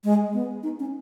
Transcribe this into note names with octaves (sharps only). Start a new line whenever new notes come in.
G#3
B3
D#4
C#4